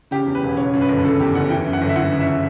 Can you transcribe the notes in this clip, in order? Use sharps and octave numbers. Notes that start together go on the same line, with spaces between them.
C#3 G4
E2
B4
E1
C#3 C#5
F#2
B4
G1
C#3 A4
E2 G4
F#1 F#5
E3 G5
F#2
F#5
G1
E5
E3 F#5
C#3
E5